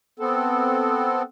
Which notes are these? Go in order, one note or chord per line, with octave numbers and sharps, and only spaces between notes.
B3 C4 A4